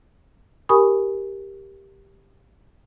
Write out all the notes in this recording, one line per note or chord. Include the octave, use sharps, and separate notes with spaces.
G4 A#4 G#5 B5 C#6 D#6